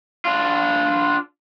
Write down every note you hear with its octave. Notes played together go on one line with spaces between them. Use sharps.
D4 F4